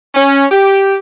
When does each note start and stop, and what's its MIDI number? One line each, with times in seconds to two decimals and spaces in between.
0.15 0.44 61
0.51 0.95 67